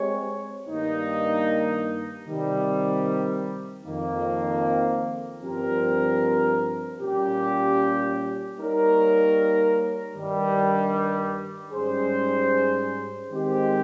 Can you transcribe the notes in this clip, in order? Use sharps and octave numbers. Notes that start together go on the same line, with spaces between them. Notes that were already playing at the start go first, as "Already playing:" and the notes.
Already playing: G#3 C4 G4 C#5
G2 D#3 A#3 D#4
C3 D#3 G3
F2 D#3 A#3
G2 F3 C4 G4 A#4
A#2 G3 C#4 G4
G3 A#3 D#4 A#4 C#5
G2 D#3 G3
G#2 G3 C#4 G#4 C5
D#3 G#3 C4 G4 C5